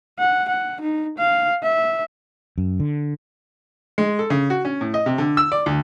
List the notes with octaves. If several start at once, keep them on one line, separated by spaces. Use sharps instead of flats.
F#5
F#5
D#4
F5
E5
F#2
D3
G#3
A4
C#3
F#4
C#4
A2
D#5
C3
D3
E6
D5
D2